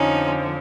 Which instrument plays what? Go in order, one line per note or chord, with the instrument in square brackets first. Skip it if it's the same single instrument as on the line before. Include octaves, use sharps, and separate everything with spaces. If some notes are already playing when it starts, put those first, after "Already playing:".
Already playing: [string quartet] F2 D3 F3 C#4 D#4